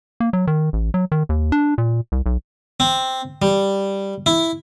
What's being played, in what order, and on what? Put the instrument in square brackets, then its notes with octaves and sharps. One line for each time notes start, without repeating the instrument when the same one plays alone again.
[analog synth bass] A#3
F#3
D#3
A1
F#3
D#3
D#2
D4
A#2
C2
B1
[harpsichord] C4
G3
E4